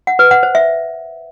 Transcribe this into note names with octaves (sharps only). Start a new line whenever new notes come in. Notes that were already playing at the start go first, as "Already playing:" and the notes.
F#5
B4
F#5
C5
E5